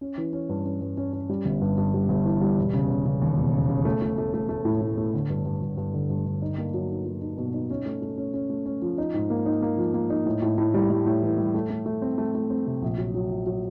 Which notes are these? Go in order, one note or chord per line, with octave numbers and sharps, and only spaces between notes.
C#4
E3
C#4
G2
C#4
G2
C#4
C#4
G3
G1
G2
G2
G3
G1
E3
G3
E1
C#3
C#3
C#3
D#2
E1
C#3
C#3
A3
A3
A3
A3
A3
A2
A2
A3
D3
G2
G2
G2
G2
D3
G2
D3
D#4
A#3
F#3
D#4
F#3
D#4
B2
D#4
C#4
A3
A3
C#4
C#4
A3
C#4
F3
D#4
G#2
A#3
D#4
A#3
F3
A#3
D#4
A2
A2
A2
G3
G3
A2
E3
G3
A3
A3
A3
C4
A3
A3
C4
C3
A#1
F#3
F#3
A#2
F#3